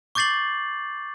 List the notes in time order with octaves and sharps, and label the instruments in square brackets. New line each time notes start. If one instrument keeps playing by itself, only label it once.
[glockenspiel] C#6 D6 G6 A6 C7 F#7